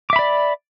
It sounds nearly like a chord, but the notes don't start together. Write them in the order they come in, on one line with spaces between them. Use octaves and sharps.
D6 E5 B5 D5